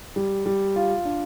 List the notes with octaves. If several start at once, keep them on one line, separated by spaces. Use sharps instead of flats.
G3
G3
F4
D4